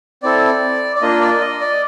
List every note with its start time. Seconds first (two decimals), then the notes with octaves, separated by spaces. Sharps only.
0.23 C4 E4 A4 D5
0.96 D5
1.02 A#3 D4 F4 D#5
1.21 D5
1.41 D#5
1.61 D5